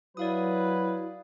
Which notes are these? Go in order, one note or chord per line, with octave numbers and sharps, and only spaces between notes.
F#3 E4 B4 D5 F5 D#6